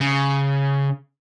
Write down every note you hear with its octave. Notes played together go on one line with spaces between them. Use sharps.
C#3